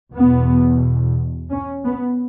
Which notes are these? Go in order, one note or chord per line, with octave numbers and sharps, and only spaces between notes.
E2 B2 B3
C#4
B3